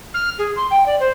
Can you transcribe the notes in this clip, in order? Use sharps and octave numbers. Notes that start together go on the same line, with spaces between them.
F6
G#4
C6
G5
D5
C5